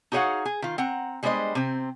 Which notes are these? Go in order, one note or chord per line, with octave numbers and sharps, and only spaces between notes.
D#4 F#4 G#4 C#5 F5 F#5
G#4
D#3 F4
C4 F#5 A#5
G3 G#3 B3 D4 C5 D#5
C3 C4